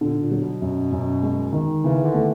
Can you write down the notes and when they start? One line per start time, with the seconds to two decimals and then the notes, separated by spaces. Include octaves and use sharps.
0.01 A#2 D3
0.21 A#2
0.31 F#3
0.42 B2
0.62 F#2
0.92 F#2
1.23 G#3
1.53 D#3
1.84 C#3 E3
2.04 D3
2.14 A3